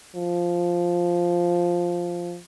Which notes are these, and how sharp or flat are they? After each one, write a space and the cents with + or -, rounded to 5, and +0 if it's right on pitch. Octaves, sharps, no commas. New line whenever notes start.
F3 +0